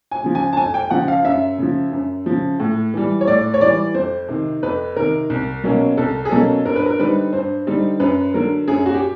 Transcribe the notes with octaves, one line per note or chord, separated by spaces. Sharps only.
G#5
C#3 F3
G#5
A5
F2 G#5
G5
C#3 F3 F#5
F5
F#2 E5
C#3 F3
F#2
C#3 F3
A2
E3 G3
C#5
A2 D5
C#5
E3 G3 D5
F2 C5
C3 D#3
F2 B4
C3 D#3 A#4
C2
B2 F#3 A#3 C#4
C2 A4
G#4
B2 F#3 A#3 C#4 A4
G2 A#4
B4
A#4
D3 G3 C4 D#4 B4
G2 C5
D3 G3 C4 D#4
F#2 B4
D3 F#3 A#4
F#2 G#4
F#4
G4